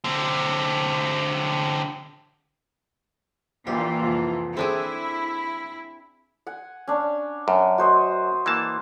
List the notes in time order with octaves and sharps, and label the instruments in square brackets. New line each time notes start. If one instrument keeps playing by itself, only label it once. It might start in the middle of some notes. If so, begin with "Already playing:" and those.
[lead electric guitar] D3 C4
[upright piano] A#1 A#2 [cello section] E3 A#3 F4 [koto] G4
[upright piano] C2 F2
[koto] C4 D4 G#4 [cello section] E4 [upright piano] A4
[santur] F#5 G#5
C#4 D4
[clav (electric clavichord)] F#2
[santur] F#4 C5 D#5
[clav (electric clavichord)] E3 A#3 A5